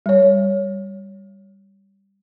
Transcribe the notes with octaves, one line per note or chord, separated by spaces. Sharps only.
G3 C#5